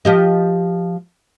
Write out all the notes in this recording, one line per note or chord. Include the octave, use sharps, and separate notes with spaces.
F3 G4 D#5